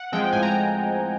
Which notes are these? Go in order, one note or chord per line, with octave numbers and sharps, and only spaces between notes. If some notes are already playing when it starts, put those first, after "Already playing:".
Already playing: F#5
F3 G#3 C4 G5
A2 G#5
A#5